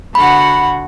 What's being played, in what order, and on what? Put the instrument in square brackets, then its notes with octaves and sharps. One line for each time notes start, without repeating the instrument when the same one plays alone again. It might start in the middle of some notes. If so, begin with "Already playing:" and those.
[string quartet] D3 F#4 F#5 [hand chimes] B5